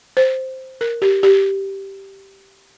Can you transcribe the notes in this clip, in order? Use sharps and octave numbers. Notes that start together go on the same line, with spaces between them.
C5
A#4
G4
G4